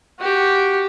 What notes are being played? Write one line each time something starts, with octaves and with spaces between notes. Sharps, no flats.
F#4 G4